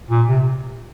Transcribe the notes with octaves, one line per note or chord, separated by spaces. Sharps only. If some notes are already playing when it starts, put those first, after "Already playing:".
A#2
C3